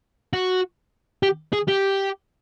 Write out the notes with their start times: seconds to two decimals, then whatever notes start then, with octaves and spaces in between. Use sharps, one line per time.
0.33 F#4
1.23 G4
1.53 G#4
1.68 G4